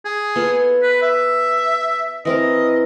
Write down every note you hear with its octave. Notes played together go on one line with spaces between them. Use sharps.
G#4
B3 F4 A4
B4
E5
E3 C4 A#4 D#5